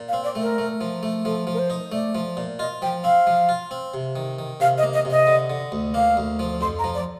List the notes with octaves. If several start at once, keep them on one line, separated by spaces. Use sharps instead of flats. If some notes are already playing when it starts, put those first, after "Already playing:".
Already playing: A#2
F5
C4
D5
A3
A#4
A3
F3
A3
F3 A4
F3
A#4
C5
D#4
A3 D5
F3
A#2
F4 D#5
F3 G5
C4 F5
F3
F4
C4
C3
D#3
D#3
C3 F5
D#5
A#3
D#5
C3
D#5
D3
D3
D2
A#3 F5
D2
F3
F2 C6
A#5
F3
D5